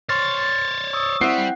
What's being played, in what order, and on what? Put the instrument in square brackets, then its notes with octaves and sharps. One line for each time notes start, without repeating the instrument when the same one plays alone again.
[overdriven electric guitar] C5 C#5 [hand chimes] C6 F6 [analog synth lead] A6
[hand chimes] C#6 D#6 E6
[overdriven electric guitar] G3 [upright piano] C4 E4 C7 [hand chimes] F#5 F#6